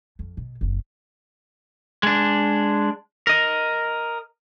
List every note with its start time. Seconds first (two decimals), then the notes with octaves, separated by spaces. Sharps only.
0.19 F2
0.37 B2
0.61 F#1 C4
2.03 G#3 D4
3.27 A#4 D#5